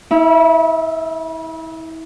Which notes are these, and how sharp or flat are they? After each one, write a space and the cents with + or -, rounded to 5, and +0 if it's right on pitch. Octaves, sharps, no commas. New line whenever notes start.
E4 -35 E5 +20